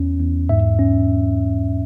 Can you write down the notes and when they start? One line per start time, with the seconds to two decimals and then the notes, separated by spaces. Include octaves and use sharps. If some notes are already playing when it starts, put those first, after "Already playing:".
Already playing: E2 C#4
0.20 E2
0.49 G#2 E5
0.79 C#4